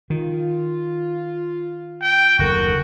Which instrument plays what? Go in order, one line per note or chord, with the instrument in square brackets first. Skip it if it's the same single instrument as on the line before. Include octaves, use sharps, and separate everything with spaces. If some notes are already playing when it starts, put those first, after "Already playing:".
[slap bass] D#3 [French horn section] F4
[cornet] G5
[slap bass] F#1 D#2 [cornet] F#4 [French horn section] A4 A#4